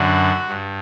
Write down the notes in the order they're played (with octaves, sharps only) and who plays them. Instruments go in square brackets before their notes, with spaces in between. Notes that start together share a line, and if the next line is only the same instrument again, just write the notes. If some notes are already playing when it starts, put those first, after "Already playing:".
Already playing: [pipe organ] F#2 D3 F#4
G2